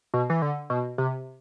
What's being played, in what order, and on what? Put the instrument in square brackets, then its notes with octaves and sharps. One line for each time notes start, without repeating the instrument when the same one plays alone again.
[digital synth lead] B2
E3
D3
B2
C3